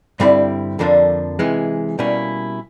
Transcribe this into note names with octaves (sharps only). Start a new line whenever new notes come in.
G2 D3 G3 C4 E4
F2 D3 F3 A#3 D4
C3 E3 G#3
B2 G3 A#3 C#4 E4